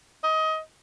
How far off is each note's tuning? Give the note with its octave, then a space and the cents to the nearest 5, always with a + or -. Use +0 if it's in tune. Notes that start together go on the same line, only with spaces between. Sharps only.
D#5 +20